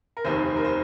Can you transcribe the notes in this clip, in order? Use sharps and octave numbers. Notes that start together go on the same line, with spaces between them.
A#4
F1 D#2 D#3 C5
A#4
C5